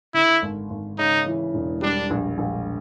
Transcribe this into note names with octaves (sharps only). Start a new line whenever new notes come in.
D3 E4
G#1
G#1
C#3 D#4
E3
E1
G3 D4
A#1
A#1